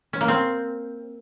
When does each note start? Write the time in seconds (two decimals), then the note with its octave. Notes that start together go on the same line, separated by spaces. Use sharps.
0.13 C#4
0.21 A#3
0.28 C4